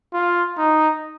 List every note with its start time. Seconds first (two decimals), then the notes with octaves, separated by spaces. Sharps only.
0.13 F4
0.58 D#4